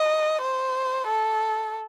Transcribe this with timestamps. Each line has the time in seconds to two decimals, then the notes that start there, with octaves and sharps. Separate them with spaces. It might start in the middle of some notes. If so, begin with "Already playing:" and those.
Already playing: D#5
0.41 C5
1.07 A4